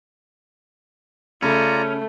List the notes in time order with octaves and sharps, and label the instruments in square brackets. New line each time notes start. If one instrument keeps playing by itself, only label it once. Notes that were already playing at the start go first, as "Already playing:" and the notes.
[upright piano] C#3 B5 [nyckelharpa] A3 [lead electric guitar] C#4 [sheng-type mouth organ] F4 D5 A#5